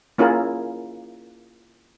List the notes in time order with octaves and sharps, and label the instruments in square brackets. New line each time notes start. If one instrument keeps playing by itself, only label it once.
[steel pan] A#3 C#4 E4 F4 G#4 A#4